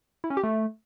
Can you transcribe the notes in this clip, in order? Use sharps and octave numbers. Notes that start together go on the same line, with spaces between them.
E4
C#4
G4
A3